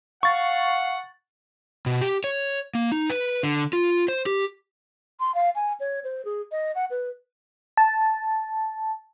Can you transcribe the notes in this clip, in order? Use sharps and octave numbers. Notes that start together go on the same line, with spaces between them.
F5 F#5 C#6 A6
B2
G4
C#5
A#3
D#4
B4
D3
F4
C5
G4
C6
F5
G#5
C#5
C5
G#4
D#5
F#5
B4
A5